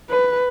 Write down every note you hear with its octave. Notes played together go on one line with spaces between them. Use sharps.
B4